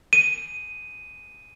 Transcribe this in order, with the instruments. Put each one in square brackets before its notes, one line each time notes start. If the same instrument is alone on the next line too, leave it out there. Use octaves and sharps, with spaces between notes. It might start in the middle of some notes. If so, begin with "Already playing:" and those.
[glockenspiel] D#7